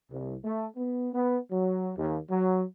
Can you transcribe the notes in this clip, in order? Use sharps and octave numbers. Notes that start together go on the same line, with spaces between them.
C2
A3
B3
B3
F#3
D#2
F#3